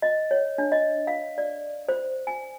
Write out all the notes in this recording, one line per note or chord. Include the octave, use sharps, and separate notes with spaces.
D#5
C#5
D4
D#5
F5
D5
C5
G#5